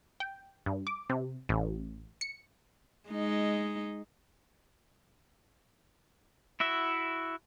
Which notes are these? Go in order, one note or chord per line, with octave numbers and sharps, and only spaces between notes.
G5
G2
D6
C3
A1
C#7
G#3 D#4
E4 F#4 E5